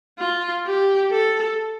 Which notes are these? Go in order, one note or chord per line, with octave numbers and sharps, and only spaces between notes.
F4
G4
A4